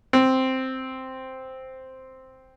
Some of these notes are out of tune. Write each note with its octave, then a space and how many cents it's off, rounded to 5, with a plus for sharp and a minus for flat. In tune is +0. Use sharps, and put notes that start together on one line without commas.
C4 +0